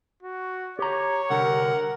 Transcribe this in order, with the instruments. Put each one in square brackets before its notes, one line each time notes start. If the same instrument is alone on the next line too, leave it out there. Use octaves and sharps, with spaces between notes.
[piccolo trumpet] F#4
[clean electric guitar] G4 A#5 [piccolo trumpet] C#5
[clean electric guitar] C2 D3 G4 [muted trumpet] A#4 [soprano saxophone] F#5